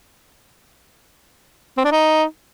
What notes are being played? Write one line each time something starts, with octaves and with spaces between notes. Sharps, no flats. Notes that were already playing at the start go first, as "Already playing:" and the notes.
C4
D4
D#4